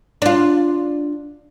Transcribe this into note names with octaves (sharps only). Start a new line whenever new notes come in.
D4 F4